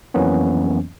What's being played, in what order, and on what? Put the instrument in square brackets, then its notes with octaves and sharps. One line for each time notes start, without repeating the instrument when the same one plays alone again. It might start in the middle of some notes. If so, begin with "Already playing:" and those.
[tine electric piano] F2 E3 F#3 A#3 B3 C#4